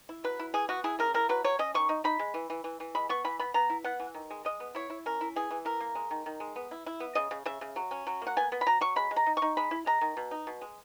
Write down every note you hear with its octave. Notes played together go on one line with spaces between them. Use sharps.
E4
F#3 B4
E4
E3 G#4
B3 F#4
E4 G#4
C#3 A#4
E4 A#4
F#3 B4
F#3 C#5
C#4 D#5
D#3 C#6
D#4
D#4 B5
G#3
E3
E3
E3
E3
G#3 B5
B3 C#6
E3 B5
B3 B5
B3 A#5
E4
B3 F#5
E3
D#3
G#3
G#3 D#5
B3
E4 C#5
E4
C#4 A#4
E4
E3 G#4
E3
E4 A#4
A#3
G#3
D#3
D#3
G#3
B3
E4
E4
B3
C#3 D#5
C#3
C#3 E5
C#3
F#3
C#4
F#3
A#3 F#5
B3 G#5
B3
B5
F#3 A#5
F#3 C#6
G#3 B5
G#3
A#5
D#4
C#6
D#4
G#3 B5
E4
G#3 A#5
D#3
B2
D#4
B2
G#3